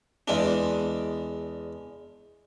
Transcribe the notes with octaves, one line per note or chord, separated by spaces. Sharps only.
E2 G#3 D4